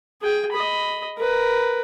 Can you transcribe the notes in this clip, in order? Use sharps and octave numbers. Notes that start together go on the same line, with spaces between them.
G#4 G5
D#5 B5
A#4 B4